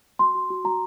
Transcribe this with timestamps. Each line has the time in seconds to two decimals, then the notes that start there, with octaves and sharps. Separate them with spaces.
0.19 F#4 C6
0.35 F#4
0.50 F#4
0.64 F#4 A#5